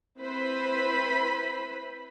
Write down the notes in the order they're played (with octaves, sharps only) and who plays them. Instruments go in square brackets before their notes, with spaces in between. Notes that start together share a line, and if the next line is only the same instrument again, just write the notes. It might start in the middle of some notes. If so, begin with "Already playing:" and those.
[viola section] C4 E4 B4 C5 B5